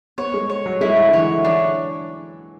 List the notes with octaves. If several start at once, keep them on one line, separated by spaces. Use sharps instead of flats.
B3 C#5
G#3
C#5
F#3
G#3 E4
F#3
D3
E3 C#5
D3
E3 D4